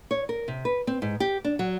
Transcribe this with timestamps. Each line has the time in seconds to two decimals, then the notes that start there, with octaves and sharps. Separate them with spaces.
0.11 C#5
0.29 A#4
0.48 C3
0.65 B4
0.87 C4
1.02 G#2
1.20 G4
1.44 D4
1.59 F#3